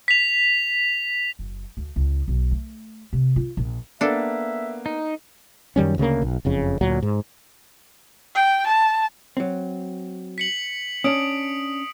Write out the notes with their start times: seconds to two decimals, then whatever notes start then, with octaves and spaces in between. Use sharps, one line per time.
0.08 B6 F7
1.39 F#1
1.77 D2
1.96 C#2
2.28 B1
2.51 A3
3.13 C3
3.36 F4
3.57 A#1
4.01 A#3 B3 D4 A4 E5
4.86 D#4
5.76 F#2 D#3 G3 C#4
5.98 D2 C#3 G#3 A#3
6.22 B1
6.45 F#1 F2 C#3
6.81 D2 A#2 F#3
7.02 G#2
8.35 G5
8.67 A5
9.37 F#3 C4
10.38 B6 C#7 F#7
11.04 C#4 D4 D#6 D7